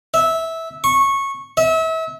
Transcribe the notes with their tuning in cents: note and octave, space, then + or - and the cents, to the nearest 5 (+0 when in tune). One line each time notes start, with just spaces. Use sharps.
E5 -15
C#6 -15
E5 -35